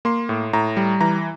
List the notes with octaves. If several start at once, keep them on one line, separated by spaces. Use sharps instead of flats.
A#3 C6
A2
A2 A#5
G3
E3 A#5